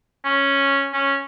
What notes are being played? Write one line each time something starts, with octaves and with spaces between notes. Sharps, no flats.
C#4
C#4